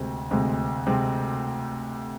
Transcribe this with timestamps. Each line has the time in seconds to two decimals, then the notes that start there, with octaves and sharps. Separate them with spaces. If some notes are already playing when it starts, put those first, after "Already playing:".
Already playing: D2 C3 G#3 C4
0.31 D2 C3 G#3 C4
0.87 C3 G#3 C4